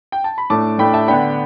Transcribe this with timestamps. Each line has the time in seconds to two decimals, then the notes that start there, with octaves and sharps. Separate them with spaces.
0.12 G5
0.24 A5
0.38 B5
0.50 A2 A3 D4 A5 D6
0.78 A2 A3 D4 G5 B5
0.94 E5 A5
1.08 D3 B3 D4 G5 B5